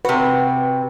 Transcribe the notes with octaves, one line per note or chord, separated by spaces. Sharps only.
C3 F#4 B4